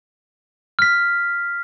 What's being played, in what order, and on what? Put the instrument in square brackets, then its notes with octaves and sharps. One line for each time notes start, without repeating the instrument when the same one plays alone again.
[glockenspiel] F6 B6